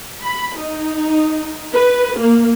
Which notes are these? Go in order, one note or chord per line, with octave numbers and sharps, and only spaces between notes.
B5
D#4
B4
A#3